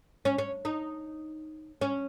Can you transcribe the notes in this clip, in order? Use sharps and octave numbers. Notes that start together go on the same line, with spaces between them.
C#4
C#4
D#4
C#4